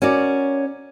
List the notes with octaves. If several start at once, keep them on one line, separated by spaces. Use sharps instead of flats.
C#4 F#4 A#4 D5